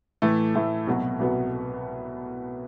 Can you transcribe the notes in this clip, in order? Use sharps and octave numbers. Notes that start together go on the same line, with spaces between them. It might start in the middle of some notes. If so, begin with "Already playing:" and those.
A2 E3 A3
A2 E3 A3
C2 B2 F#3 B3 F#4
C2 B2 F#3 B3 F#4